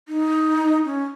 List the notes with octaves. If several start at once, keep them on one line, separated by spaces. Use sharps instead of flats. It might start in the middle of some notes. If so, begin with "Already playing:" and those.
D#4
C#4